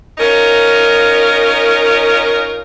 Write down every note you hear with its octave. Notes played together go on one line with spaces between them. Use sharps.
C#4 D#4 F4 A#4